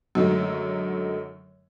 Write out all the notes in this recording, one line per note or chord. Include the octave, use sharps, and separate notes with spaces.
F#2 D3 D#3 F#3 G#3 A3